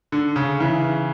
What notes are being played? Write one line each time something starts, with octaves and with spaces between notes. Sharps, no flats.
D3
C#3
C#3 E3